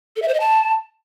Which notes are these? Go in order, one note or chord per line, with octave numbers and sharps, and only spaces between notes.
A4
E5
C5
D#5
A5